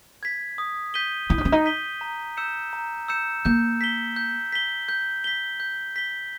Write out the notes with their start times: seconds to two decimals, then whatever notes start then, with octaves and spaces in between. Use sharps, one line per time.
0.23 G#6 B6
0.58 D#6
0.94 G6 B6 D#7 G7
1.29 E4 D#6
1.38 D#4
1.45 C#4
1.52 D#4
1.66 G6 B6 D#7 G7
2.01 A#5
2.37 E6 G6 C#7 E7
2.73 A#5
3.08 E6 G6 C#7 E7
3.45 A#3 G6
3.81 B6 G7
4.16 G6
4.52 B6 G7
4.89 G6
5.24 B6 G7
5.60 G6
5.96 B6 G7